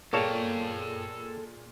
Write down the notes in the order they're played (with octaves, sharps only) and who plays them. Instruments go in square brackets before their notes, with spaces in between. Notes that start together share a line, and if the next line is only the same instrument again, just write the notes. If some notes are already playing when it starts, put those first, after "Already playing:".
[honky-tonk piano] A#2 G#4 D5 [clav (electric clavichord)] A#3 C#5 A5 [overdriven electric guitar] A4 G5